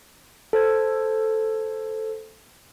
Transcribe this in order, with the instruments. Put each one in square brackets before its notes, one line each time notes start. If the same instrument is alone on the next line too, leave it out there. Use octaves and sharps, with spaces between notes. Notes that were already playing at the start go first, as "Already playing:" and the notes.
[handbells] A4 C5 G#6